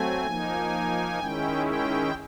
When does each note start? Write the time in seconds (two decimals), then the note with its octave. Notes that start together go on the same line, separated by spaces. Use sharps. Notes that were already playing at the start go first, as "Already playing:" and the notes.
Already playing: F#3 A3 C4 G#5
0.27 F3 A#3 D#4
1.19 D#3 G#3 C#4 E4 G5
1.66 G5